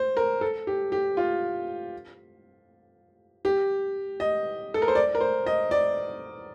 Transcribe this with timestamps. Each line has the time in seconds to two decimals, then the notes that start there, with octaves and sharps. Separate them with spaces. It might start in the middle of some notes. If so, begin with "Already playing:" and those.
Already playing: C5
0.17 A#4
0.41 A4
0.67 G4
0.92 G4
1.17 F4
3.45 G4
4.20 D#5
4.74 A4
4.82 A#4
4.88 C5
4.95 D5
5.15 A#4
5.21 C5
5.46 D#5
5.71 D5